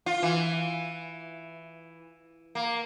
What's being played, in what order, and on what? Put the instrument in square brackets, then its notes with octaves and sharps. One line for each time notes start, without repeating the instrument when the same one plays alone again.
[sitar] F4
E3
A#3